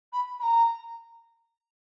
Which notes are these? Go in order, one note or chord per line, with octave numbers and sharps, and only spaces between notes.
B5
B5
A#5